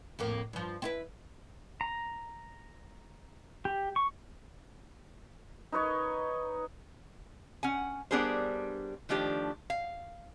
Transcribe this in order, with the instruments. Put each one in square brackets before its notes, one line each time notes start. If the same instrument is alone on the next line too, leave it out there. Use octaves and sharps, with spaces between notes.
[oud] F2 A2 A#3
G2 F3
C4 E4 B4
[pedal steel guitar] A#5
G4
C#6
[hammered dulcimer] D#4 B4 C#5 D#5
[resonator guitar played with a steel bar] C#4 F#5 G#5
G3 B3 D4 G#4 A#4 C5
D#3 F3 A3 D4 G4 C5
F5